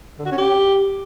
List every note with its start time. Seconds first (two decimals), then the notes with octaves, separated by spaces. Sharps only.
0.19 D3
0.26 F#4
0.32 C#4
0.38 G4